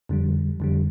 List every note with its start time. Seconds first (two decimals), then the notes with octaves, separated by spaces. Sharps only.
0.09 F2 D3 G3
0.60 F2 D3 G3